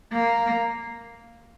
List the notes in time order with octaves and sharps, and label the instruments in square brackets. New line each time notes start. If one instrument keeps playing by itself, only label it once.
[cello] A#3